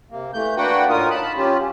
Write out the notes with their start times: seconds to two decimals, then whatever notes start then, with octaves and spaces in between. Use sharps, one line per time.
0.11 C3 A#3
0.33 E3 A3 G6
0.57 A#3 D4 F#4 B4 F#5 G5
0.89 A2 D#4 F4 A#4 D#6
1.10 A5 B5
1.37 F#3 C#4 F4 G4